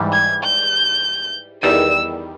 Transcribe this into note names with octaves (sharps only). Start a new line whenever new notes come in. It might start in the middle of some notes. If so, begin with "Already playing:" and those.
Already playing: G#2 E3 G3
G#6
G6
E2 D#3 G3 E6